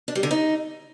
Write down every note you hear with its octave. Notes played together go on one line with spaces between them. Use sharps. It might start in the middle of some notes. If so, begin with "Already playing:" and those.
D4
G3
D3
D#4